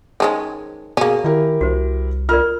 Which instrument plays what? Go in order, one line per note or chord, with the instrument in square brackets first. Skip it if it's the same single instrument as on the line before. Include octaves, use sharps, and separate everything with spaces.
[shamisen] D#3 G#3 C#4 [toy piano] C5 A5
[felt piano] B2 G#4 [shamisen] A#3 C#4
[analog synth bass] D#3 [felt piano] E4 G4 A#4
[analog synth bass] C2 [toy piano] F#4 C5
[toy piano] F4 A#4 D5 [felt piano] F6